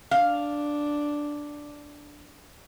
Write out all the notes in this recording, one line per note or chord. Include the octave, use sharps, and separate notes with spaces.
D4 F5